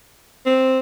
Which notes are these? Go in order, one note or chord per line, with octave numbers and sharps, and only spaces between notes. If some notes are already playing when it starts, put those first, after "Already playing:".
C4